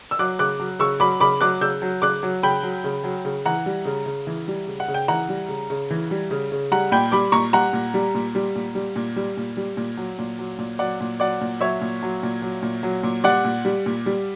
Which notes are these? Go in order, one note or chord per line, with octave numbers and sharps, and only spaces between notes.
E6
F#3 D6 F#6
C#3 D6 F#6
F#3
C#3 C#6 E6
F#3 B5 D6
C#3 B5 D6
F#3 D6 F#6
C#3 E6 G6
F#3
C#3 D6 F#6
F#3
C#3 G5 B5
F#3
C#3
F#3
C#3
E3 F#5 A#5
G3
C#3
C#3
E3
G3
C#3
F#5
C#3
G5
E3 F#5 A#5
G3
C#3
C#3
E3
G3
C#3
C#3
G3 F#5 A#5
A#2 G5 B5
G3 B5 D6
A#2 A#5 C#6
G3 F#5 A#5
A#2
G3
A#2
G3
A#2
G3
A#2
G3
A#2
G3
A#2
F#3
A#2
F#3
A#2
F#3 D5 F#5
A#2
F#3 D5 F#5
A#2
F#3 C#5 E5
A#2
F#3
A#2
F#3
A#2
F#3
A#2
G3 D5 F#5
A#2
G3
A#2
G3